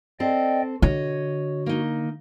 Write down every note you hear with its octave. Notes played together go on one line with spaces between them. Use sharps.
C4 A4 D5 D#5 G5
D3 F#4 C#5 D#5
A#3 D#4